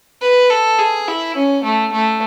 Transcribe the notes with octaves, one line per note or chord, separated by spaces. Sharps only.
B4
A4
G#4
E4
C#4
A3
A3